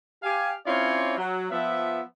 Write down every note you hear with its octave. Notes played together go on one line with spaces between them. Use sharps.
G4 F5 G#5
C4 C#4 E4 F4 C#5 D5
F#3
F3 B3 E5